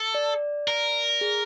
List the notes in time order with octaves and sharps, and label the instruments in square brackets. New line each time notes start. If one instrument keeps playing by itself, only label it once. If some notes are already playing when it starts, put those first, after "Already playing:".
Already playing: [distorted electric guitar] A4
[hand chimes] D5
[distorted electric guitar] A#4
[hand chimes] G#4